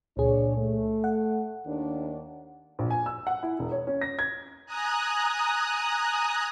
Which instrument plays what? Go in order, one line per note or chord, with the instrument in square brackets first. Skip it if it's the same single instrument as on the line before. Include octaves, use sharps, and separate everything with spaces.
[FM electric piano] C#2 A#2 G#4 [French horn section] D4 C#5
[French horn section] A3
[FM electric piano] F#5
[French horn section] D#2 D#3 D4
[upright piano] A#1
G#5
E6
F#5
E4
E1
C#5
C#4
A#6
G#6
[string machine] G#5 A#5 D#6 F#6